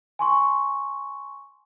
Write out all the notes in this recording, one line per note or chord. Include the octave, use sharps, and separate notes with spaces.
G#5 C6 C#6